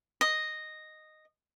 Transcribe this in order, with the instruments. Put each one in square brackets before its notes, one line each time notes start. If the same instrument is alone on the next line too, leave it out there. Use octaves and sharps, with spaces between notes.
[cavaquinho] D#5